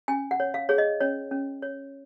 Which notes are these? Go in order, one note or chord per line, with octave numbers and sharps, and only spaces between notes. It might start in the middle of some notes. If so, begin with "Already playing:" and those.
C#4 G#5
F#5
C#5
F5
G#4 C#5
D#5
C#4 C#5
C#4
C#5